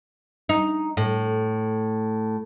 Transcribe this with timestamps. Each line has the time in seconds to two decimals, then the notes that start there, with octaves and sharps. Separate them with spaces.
0.49 D#4
0.97 A2